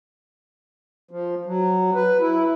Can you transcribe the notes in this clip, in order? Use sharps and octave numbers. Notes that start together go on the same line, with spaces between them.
F3
F#3
B4
E4